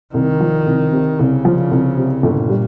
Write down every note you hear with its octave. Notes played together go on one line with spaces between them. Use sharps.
C2 D#3
F3
C2
C3
C2 C#3
F3
C2
C3
G1 A#2
G3